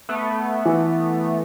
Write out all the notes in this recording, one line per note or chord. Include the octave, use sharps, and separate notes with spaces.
A3 B3
E3